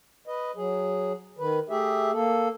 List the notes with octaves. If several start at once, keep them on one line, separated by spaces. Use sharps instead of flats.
B4 D#5
F#3 G#4
D#3 B4
A3 G4 G#4 E5
A#3 A4